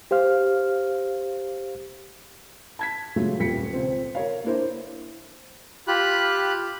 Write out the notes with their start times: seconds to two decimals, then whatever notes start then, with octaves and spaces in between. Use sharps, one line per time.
0.11 G4 C5 F5 F6
2.79 A5 G#6 B6
3.16 A#2 C#3 F3 F#3 G#3 A3
3.39 D#1 F2 G3 B6 C#7
3.73 C#2 C4
4.15 A#4 C#5 F5
4.44 A#3 D4 E4 A#4 C5
5.88 F4 G4 B5 F#6